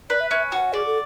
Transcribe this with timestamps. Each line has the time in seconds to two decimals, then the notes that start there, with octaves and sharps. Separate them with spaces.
0.10 B4 D5
0.20 E5
0.30 C#4 E5
0.52 F#4 F#5
0.73 G#4 D5
0.86 A4